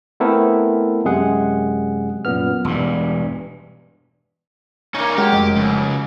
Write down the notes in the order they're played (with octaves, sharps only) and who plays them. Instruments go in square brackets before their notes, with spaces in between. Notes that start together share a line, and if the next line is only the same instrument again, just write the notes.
[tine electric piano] A3 B3 C4 E4 A4 A#4
F#2 C3 G#3 G#4 F#5
F#2 A#2 B3 F6
[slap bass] E1 G2
[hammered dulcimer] C#3 A#3 [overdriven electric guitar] C#4 D#4
[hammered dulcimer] F#3 [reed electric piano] G#3 [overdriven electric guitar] G4
[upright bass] F1 F3 [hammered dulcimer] D#5
[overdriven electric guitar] C#2